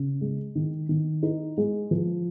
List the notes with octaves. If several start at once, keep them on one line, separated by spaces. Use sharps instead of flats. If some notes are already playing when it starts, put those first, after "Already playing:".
Already playing: C#3
G#3
D#3
D#3
D#4
G#3
F3